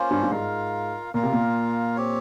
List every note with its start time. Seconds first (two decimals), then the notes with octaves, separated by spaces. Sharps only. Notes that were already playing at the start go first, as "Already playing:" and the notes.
Already playing: A#3 C#4 F4 C5
0.11 G2
0.23 G2
0.31 G#2 F4 A#4 F5
1.14 A#2 F4 A#4 F5
1.23 C3
1.33 A#2
1.96 C4 G4 C#5